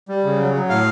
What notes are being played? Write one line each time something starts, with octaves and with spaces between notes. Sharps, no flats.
G3
C#3
F#3
F#3
A2 F5